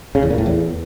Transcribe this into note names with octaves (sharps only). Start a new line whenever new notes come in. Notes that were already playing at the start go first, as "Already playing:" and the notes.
C#3
E2
A#2
A2
E2